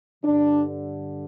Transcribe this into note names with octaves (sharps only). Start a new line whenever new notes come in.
G2 D3 D4